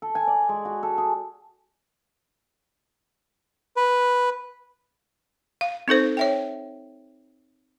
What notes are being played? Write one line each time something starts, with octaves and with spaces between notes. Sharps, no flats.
A4
G#5
D5
G#3
F#4
A4
G#4
B4
F5
C4 D#4 A4 C5
C#5 E5 G5